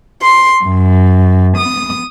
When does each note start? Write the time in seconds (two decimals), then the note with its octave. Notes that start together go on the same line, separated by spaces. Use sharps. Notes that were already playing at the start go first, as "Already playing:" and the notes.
0.21 C6
0.64 F#2
1.57 D#6